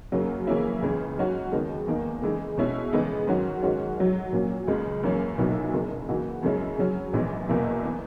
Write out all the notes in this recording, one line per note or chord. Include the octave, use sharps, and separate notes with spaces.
F#2 C#3 F#3 A#3 C#4
C#3 E3 A#3 C#4 E4
C#2 C#3 E3
G#2 F#3 C#4 F#4
D#2 C#3 G#3 B3 D#4
E2 D#3 A#3 D#4
C#3 E3 G#3 D#4
B2 G#3 C#4 E4
C#3 E3 G#3 B3 D#4
G#2 D#3 F#3 C#4 F#4
G#2 D#3 G#3 C#4 F#4
G#2 F#3 C#4 F#4
A#2 F#3 A#3 C#4
C#2 C#3 G#3
F#2 E3 A#3 C#4
B1 A#2 F#3 B3 E4
F#1 F#2 C#3
C#3 E3 A#3 D#4 F#4
F#2 C#3 G#3 C#4 E4
C#3 F#3 C#4
A#1 G#2 E3 B3
F#1 E2 B2 A#3 E4
E3 B3 E4